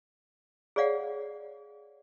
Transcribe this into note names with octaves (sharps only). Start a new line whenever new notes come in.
G#4 C#5 D5 F5 F#5